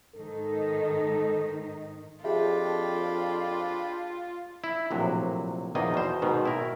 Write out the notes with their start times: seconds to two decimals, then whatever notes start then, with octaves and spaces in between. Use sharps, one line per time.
0.15 G#2 D#3 D#4 A4
2.24 F2 D4 F4 G4 G#4 E5 G5 B5
4.64 E4
4.91 A#1 A2 C3 F#3
5.75 A#1 E2 D#3 A#3 D#5
5.94 B2 C5
6.22 G#2 B2 D#3
6.45 E4 A#4